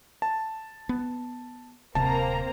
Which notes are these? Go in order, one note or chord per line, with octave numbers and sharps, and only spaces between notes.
A5
B3
D1 C3 A#3 C4 A5 A#5